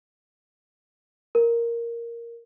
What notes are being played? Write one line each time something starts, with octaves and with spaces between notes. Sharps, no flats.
A#4